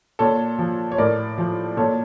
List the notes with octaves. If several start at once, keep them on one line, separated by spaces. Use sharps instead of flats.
A#2 A4 C#5
F3
C#5
A2 A#4 D5
F3
A#2 A4 C#5